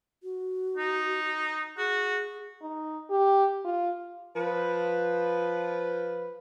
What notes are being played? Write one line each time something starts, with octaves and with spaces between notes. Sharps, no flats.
F#4
D#4
F#4 G#4
D#4
G4
F4
F3 B4